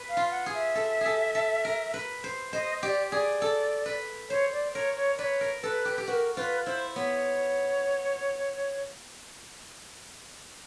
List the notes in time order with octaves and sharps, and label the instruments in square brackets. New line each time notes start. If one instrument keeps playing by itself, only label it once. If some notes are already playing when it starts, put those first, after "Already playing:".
Already playing: [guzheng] B4
[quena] F5
[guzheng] F4
[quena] F#5
[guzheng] G#4
[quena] E5
[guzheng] A4
G#4 A4
A4
A#4
B4
C5
[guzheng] C5 [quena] D#5
[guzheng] G4 [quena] D#5
[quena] D5
[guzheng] G#4 [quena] D5
[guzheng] A4
B4
[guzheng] C5 [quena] C#5
[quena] D5
[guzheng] A#4 [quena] C#5
[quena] C#5
[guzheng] B4 [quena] C#5 D5
[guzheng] A#4
[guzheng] A4 [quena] B4
[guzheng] G4
G4
[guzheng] F#4 [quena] B4
[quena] A#4
[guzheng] F4 [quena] B4 C5
[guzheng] E4 [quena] C5
[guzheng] B3 [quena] C#5